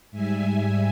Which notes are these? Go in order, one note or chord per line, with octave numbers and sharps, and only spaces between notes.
G#2 G3 E5 G#5